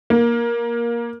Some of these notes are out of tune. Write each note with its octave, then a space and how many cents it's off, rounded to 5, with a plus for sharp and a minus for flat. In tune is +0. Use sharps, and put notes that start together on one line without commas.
A#3 +15